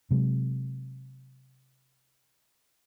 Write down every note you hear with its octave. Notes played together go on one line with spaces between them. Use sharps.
C3 F#3 G#3